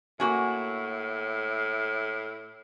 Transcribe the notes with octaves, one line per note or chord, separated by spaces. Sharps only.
A2 A#3 F#4 G#5